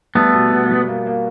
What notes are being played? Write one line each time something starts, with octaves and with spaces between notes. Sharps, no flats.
G3 A3 B3
B2
B2
G3
A#3
A#3